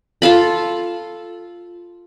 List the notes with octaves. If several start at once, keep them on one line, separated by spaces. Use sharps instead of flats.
F4 A4 F5 B5